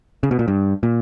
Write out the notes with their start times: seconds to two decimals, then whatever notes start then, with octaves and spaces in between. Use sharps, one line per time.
0.23 C#3
0.31 B2
0.39 A#2
0.48 G2
0.83 A#2